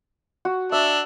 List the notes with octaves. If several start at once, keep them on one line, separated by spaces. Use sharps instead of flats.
F#4
D4 E5